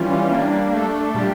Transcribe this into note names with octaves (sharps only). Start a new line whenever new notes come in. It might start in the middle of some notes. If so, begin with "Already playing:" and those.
Already playing: E3 G3 C#4 F4
G3 A#3 D4
A3 D4 A4
A#2 G3 D4 G4